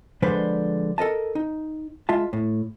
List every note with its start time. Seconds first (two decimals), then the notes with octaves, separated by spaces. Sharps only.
0.22 D3 F3 G#3 D4 B4 C5
0.98 A4 A#4 D#5 A5
1.35 D#4
2.09 G#3 F4 E5 A5
2.33 A2